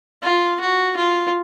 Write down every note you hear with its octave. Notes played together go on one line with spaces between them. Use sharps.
F4
F#4
F4